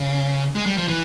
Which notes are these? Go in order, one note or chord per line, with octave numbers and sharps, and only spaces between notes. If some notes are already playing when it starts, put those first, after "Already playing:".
Already playing: C#3
G#3
G3
F3
E3